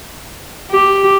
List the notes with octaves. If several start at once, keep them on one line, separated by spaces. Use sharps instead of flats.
G4